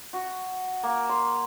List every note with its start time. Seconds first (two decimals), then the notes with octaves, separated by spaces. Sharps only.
0.13 F#4
0.83 A#3
1.09 C6